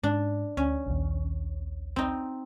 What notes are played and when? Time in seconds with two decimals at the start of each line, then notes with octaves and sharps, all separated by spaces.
0.03 G#2 D4
0.57 D2 C#4
0.86 A#1 D#2
1.96 C4 D#4